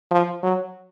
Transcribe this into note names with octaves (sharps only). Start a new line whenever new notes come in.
F3
F#3